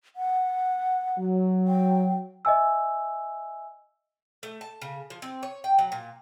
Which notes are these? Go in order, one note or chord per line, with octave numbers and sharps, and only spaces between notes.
F#5
F#3
G5
D#5 E5 G#5 E6
A3
A5
C#3
F3
C4
C#5
G5
F#3
A#2